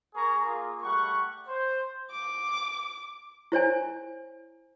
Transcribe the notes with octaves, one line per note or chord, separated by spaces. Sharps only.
A#3 G#4 A#4 A#5 C#6
A#3 F4 G#4
G3 A3 F#5 C#6
C5
D6
E4 C5 C#5 G#5